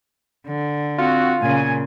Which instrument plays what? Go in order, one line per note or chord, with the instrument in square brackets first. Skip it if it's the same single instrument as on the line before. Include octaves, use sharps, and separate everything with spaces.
[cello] D3
[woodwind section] C4 F#4 [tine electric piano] F4
[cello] A#2 C#3 [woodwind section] G#5